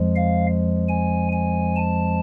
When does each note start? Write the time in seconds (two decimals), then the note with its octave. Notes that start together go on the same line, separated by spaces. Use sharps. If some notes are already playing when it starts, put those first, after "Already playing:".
Already playing: F2 F3 G#3
0.16 F5
0.89 G#5
1.33 G#5
1.76 A5